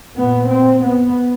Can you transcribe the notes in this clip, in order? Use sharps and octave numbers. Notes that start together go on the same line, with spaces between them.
A#2 B3
C4
B3